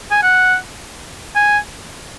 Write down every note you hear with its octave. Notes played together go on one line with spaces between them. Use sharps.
G#5
F#5
G#5